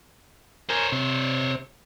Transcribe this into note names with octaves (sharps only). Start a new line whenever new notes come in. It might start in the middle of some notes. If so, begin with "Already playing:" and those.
A#4 C5 C#5 G#5
C3